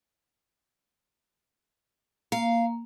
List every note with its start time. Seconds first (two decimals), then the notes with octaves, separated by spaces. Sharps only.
2.32 A#3 F5